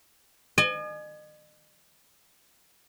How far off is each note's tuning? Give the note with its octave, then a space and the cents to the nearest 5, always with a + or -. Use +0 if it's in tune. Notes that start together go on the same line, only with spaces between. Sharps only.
D#5 -40 G#5 +25